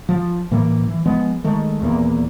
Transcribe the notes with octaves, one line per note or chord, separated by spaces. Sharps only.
F3
A2 E3 G3 A#3
E3
F3 G#3 B3
D#3 G#3 A3
D#1 E2 D#3 A#3